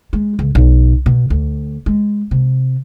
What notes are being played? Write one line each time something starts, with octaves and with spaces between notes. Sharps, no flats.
G#3
C#2
B1
B2
D2
G#3
C3